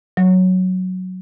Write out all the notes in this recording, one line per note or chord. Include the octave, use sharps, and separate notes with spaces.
F#3